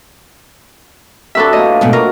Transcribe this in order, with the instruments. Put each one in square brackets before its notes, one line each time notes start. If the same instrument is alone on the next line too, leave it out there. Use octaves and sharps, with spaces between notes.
[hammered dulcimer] C3 F#3 D4 [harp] A4 B4 E5
[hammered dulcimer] A2 A#3 [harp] D#5
[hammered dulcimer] F4
[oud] G#2 B2 A3
[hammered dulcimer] F#3 D6 [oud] F4 [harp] A#4